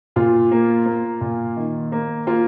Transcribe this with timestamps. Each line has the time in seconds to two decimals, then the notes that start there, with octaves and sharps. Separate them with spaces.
0.16 A#2 F4
0.51 A#3
0.86 A#3
1.21 A#2
1.57 D#3
1.92 A#3
2.27 A#3 F4